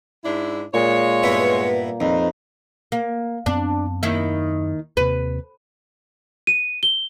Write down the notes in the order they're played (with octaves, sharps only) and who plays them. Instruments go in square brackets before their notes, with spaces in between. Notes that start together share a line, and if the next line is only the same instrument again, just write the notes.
[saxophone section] G#2 D4 E4
[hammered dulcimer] A#2 A#5 [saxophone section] G#3 C#5
[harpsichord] G2 B3 E4
[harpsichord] F2 [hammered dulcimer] D#4 B4
[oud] A#3
[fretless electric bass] F#2 B3 C4 [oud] D4
[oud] D#2 D#3 E4
[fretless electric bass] D#2 C3 [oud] B4
[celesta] D#7
G7